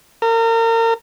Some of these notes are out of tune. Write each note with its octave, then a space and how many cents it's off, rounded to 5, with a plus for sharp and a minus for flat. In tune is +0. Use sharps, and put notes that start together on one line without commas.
A#4 -35